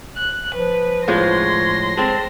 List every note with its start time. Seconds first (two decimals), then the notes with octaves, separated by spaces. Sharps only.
0.16 F#6
0.55 F3 B4
1.08 A2 F3 G#3 C#5 C6 A#6
1.97 G#3 C4 A5